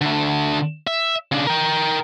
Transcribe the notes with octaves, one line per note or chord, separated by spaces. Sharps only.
D3 A3
E5
C#3 D4
A#4 G5